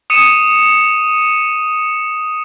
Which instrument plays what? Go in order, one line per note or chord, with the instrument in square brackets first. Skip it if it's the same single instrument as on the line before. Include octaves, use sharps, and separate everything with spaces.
[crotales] D#6 C#7 D#7 E7